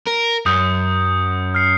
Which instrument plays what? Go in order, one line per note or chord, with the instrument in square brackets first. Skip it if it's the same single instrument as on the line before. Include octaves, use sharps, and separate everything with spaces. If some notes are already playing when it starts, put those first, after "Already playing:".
[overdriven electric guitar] A#4
[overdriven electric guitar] F#2 [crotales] D#6 G6 C#7
[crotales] F6 C7 C#7